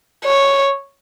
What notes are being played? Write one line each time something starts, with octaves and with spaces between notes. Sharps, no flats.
C#5